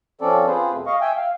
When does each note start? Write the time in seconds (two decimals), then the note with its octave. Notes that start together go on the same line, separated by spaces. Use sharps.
0.21 F3 C4 C#4 A4 D5
0.47 C4 F4 G#4 B4 C5
0.73 E2 B2 A3
0.86 D#5 F5 C#6
1.01 E5 G5 G#5
1.17 F5